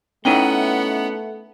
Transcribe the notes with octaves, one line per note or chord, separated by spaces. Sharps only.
A3 B3 C#4 D#4 E4 D#5 F#5 G5